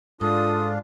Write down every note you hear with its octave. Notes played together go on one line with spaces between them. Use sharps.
G#2 D4 F4 A4 D#6